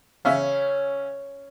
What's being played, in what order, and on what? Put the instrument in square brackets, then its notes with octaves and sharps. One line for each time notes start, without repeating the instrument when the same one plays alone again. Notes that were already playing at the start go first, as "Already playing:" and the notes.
[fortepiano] C#3 E5 F5 [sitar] C#4